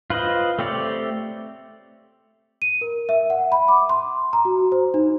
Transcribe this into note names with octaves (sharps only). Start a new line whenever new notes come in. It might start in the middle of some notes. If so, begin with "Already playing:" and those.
F4 B4 C5 D#5
A3 C4 G4 C#5 D5
D#7
A#4
E5
F#5
B5
D6
C6
A#5
F#4
C5
D#4